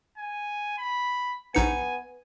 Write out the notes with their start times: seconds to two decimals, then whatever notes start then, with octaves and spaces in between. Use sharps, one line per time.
0.18 G#5
0.78 B5
1.55 A#1 B3 D#4 G#5 C#7